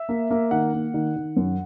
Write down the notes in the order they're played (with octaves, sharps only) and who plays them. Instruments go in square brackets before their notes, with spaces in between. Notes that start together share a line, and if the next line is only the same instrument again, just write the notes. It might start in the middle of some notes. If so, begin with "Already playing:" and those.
Already playing: [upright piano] E5
A#3
A#3
D#3 F#5
A#3
D#3
D#3
F#2